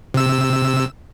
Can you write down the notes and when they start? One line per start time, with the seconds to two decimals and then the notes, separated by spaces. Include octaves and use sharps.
0.14 C3 E6